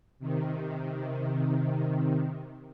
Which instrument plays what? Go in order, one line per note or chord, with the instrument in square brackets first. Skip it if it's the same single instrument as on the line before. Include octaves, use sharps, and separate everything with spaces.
[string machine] C3 D#3